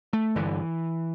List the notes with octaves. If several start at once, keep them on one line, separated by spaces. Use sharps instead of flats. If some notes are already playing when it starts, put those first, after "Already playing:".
A3
G1 G2 D3 E3